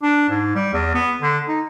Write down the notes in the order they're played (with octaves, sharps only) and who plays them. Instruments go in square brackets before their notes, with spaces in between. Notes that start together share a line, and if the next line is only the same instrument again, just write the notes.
[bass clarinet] D4
G#2
G3
E2
B3
D3
D#4